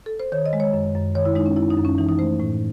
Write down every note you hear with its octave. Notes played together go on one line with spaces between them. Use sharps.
A4
C5
D#3 C#5
D#5
G#3
C#5
F#2
F#2
D#3 C#5
E4
G#3 D#4
C#4
F#2 E4
D#4
F#2
C#4
E3 D#4
D#4
A3 C5
A2